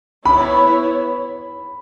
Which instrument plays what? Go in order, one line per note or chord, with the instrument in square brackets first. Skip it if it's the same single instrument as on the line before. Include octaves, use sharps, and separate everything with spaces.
[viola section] B3 E4 C#5 [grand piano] B5